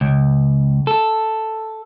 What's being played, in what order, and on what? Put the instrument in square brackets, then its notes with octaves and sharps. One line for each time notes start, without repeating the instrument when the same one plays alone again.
[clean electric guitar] C#2
A4